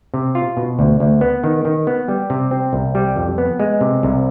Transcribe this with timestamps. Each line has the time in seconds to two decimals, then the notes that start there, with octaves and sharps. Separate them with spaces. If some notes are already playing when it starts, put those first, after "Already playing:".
0.14 C3
0.35 F4
0.57 B2
0.79 D2
1.00 D2
1.21 B3
1.44 D#3
1.65 D#3
1.87 B3
2.08 G3
2.30 C3
2.51 C4
2.73 C2
2.95 G3
3.16 F2
3.38 B3
3.59 G#3
3.81 C3
4.03 C2